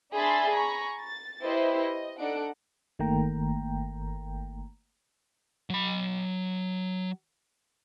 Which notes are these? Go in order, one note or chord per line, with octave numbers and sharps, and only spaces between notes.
D4 G#4 E5 B5 C6 A6
G#5 A#5 B5 C#6
A6
E4 G4 B4 C5 D#5
D#5
D4 D#4 A4 F#5 D7
G1 D#3 A3 A#3 G5 A#5
F#3 B5